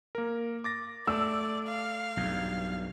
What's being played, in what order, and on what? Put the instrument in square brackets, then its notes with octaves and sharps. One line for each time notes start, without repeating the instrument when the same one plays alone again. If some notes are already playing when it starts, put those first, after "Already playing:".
[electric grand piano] A#3 A#4
D6 A6 A#6
[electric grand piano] A3 [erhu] D5 [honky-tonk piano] E6
[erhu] F5
[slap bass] B1 E2 G2